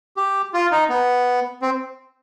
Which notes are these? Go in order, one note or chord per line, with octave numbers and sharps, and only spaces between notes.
G4
F4
D#4
B3
C4